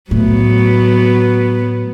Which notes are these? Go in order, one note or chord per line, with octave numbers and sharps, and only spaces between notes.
A2 F#3 B3